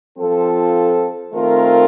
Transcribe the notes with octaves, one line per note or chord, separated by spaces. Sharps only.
F3 C4 F4 A4
D#3 A3 C4 F4 A#4